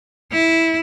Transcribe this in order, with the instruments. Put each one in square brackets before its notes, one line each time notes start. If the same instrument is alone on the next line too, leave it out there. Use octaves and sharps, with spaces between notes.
[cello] E4